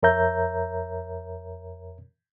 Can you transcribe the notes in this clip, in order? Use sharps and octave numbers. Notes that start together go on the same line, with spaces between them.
F2 A#4 C#5 E5 A#5 G6